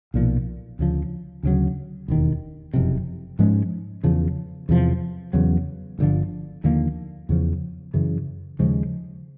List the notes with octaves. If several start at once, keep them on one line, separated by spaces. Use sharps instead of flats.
B1 A#2 F3
D2 C#3 F3
D2 C#3 F#3
E1 D#2 D#3
F#1 F2 C3
G#2 F3 G#3 C#4
E2 C#3 F3
E2 C3 F3
E2 C#3 F#3
G1 F#2 D3 F3
D#2 D3 F3 A#3
E2 C#3 F3
F#2 C#3 E3
D#2 C#3 F3 G#3